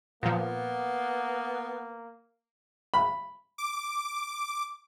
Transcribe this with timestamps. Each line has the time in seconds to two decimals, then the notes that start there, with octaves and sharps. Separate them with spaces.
0.23 A#2 F3 A#3 B3
2.94 B5
3.58 D6